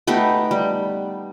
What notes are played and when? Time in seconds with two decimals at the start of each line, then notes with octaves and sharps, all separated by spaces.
0.07 A3 B3 D#4 G4
0.51 G3